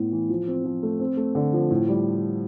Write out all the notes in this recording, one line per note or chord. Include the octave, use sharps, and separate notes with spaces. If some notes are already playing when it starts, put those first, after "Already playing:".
Already playing: A2 B3 E4
E3
F3
C4
F3
A3
C4
A3
D3
F3
A2
G3